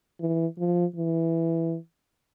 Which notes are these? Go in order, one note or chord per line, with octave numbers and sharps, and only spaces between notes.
E3
F3
E3